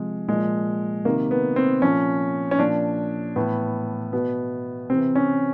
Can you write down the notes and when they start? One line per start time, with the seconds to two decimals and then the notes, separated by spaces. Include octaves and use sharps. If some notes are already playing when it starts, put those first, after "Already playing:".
Already playing: C3 F3 G#3
0.28 A#2 F3 G#3
1.05 C3 D#3 A#3
1.31 B3
1.56 C4
1.82 A#2 F3 C#4
2.51 C#4
2.59 A#2 F3 D4
3.36 A2 E3 B3
4.13 B2 B3
4.90 C3 C4
4.94 E3
5.16 C#4